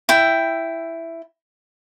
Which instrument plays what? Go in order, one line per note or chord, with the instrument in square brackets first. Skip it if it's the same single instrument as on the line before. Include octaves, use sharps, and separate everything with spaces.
[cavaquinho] E4 G5